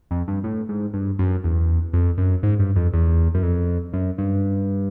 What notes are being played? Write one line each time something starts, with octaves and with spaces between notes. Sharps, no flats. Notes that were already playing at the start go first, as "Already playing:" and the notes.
F2
G2
A2
G#2
G2
F#2
E2
F2
F#2
G#2
G2
F2
E2
F#2
F2
F#2
G2